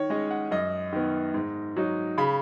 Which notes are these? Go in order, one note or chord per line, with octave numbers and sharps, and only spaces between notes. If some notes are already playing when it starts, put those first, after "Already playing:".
Already playing: D#3 C#5
G#3 C#4 D#5
F#5
F#2 D#5
D#3 B3
G#2
F#3 D#4
C#3 B5